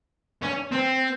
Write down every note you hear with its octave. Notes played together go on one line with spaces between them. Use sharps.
C#4
C4